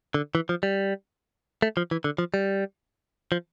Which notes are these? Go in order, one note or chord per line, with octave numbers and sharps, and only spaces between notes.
D3
E3
F3
G3
A3
F3
E3
D3
F3
G3
F3